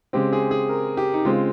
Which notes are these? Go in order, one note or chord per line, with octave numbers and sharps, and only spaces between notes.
C#3 G#3 C4 G4
G#4
G#4
A#4
G4
D#4
C#3 G#3 C4 F4